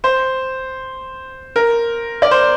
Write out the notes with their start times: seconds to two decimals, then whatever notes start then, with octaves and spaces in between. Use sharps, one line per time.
0.04 C5
1.56 A#4
2.22 D5
2.31 C5